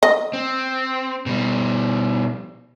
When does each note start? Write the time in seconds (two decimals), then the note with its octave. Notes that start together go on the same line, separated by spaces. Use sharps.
0.03 D#5
0.33 C4
1.26 B2 G3